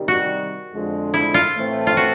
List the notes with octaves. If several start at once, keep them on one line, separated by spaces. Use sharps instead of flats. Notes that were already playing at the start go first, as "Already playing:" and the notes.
Already playing: C3 D#3 G3
F#4
F2 D3 F3 G#3
E4
F4
A2 E3 A3 C4
F4
F#4